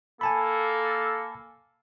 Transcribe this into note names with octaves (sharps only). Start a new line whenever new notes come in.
A#3 A4 G#5 A5 B5